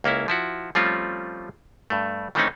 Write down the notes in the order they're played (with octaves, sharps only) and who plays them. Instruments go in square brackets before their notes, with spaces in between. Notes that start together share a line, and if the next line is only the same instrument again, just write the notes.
[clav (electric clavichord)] C#2 A#3 C#4 E4
F3 E4 F#4
F3 G3 A3 C4 C#4 F4
G2 A3
D#3 E3 A3 C4 C#4 D#4